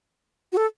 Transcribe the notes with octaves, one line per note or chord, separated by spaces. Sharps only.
F#4
A4